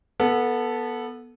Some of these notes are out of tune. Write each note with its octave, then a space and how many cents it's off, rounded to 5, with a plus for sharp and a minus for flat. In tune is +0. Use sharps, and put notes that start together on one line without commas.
B3 -20 A4 +0